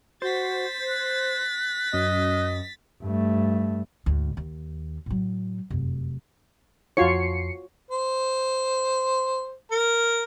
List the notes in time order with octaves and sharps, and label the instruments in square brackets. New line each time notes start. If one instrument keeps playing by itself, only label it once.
[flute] F#4 [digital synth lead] C5 [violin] A6 B6
[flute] F#6
[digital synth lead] F#2 [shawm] D#5
[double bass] G2 A3
[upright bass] D2 G#2
D#2
A2 F#3
F1 F#2
[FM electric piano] F2 C7 C#7 [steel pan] F4 F#4 C#5
[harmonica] C5
A#4